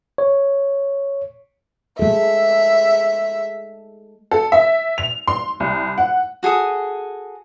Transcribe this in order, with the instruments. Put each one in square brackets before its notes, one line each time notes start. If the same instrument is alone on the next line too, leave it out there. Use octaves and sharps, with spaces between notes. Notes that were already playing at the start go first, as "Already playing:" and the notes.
[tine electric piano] C#5
[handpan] G#3 A4 [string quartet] E5
[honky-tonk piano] A4
E5
F7
C6
C2
F#5
[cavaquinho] F#4 G#4 A4 D#6